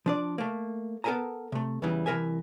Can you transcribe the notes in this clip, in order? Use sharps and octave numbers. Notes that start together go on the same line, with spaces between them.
F3 D4 D5
A3 A#3
B3 A4 A#4 E5 G#5 A#5
C3 A3
E2 C#3 E3 G3
C2 E3 A#3 A#4 E5 G#5